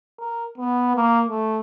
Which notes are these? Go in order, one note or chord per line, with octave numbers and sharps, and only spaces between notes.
A#4
B3
A#3
A3